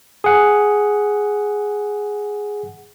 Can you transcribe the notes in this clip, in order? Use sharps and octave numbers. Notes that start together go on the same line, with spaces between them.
G#4 F#5